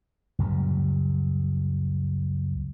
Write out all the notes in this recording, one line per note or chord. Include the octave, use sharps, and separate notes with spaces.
C#2 F#2 A#2 G3